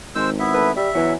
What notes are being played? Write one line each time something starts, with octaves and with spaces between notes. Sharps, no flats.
G#1 G#3 C5 E6
B3 E4 E5
A3 B4
G3 E5
E2 E3 F#3